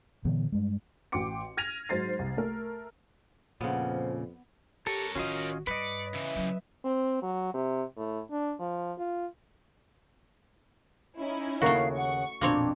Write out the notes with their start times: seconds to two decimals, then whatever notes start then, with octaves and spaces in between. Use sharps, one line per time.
0.25 A#2 D3 E3 B3
0.52 G2 G#3
1.12 A1 F#4 G5 C6 D6 C#7
1.57 F6 G#6 A#6 D#7 F7
1.89 G#2 F#3 C5 A6 C7
2.19 C2
2.37 A3 A#4
3.61 F2 A#2 C#3 F3 B3
4.87 G4 A4 A#4 C#5
5.15 A1 D#3 C#4 F4 F#4 D#5
5.67 G2 B4 D5 D#5 C#7
6.14 C#3 E3 E5
6.36 F#3 C#4
6.84 C4
7.22 F#3
7.54 C3
7.96 A2
8.31 D4
8.60 F3
8.98 F4
11.17 C#4 D#4 E4
11.62 D#2 C#3 A3 F#4 A#4 F5
11.97 F#5 C#6
12.41 A#1 F2 B2 A#3 C4 D4 C#5